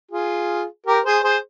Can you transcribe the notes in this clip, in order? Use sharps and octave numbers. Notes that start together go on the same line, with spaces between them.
F4 G#4
G4 A#4
G#4 C5
G#4 C5